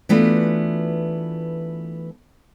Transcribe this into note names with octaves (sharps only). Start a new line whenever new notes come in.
E3 A3 B3 D4 F4 F#4